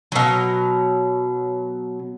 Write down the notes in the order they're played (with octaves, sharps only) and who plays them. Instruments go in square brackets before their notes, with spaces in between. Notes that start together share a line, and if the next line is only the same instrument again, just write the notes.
[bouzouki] B2 F#3